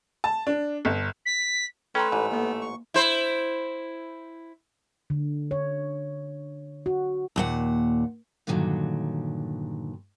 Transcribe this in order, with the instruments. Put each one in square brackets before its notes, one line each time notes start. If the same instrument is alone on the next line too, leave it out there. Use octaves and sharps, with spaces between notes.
[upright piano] A5
D4
G1
[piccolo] B6
[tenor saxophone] A3 [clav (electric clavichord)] C#4 [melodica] B4 [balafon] G5 A#5 C6
[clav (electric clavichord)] A1 G#2
[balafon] A#3 [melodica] B3
[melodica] C#6
[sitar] E4 C5
[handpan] D3
C#5
F#4
[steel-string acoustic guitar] D#2 A#2 F#5
G2 A#2 D3 D#3 F#3